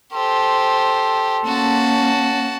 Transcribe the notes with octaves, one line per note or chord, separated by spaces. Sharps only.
G4 A4 C5 C6
A#3 C#4 F#4 A5